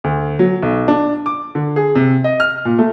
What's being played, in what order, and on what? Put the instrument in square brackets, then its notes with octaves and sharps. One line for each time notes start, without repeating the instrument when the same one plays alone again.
[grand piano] D2
F#3
B1
D4
D6
D3
G#4
C3
D#5
F6
A#2
A3